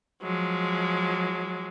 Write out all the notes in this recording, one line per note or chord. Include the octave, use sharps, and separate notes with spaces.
F3 F#3 G#3